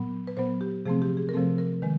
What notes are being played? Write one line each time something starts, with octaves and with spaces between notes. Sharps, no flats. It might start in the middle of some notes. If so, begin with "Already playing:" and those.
Already playing: A#2 F#3 B3
B4
A#2 F#3 B3 C5
G4
C3 F3 A3 C4 G#4
G4
G#4
A#4
C3 F3 A3 C4 A4
A#4
D#3 G#3 B4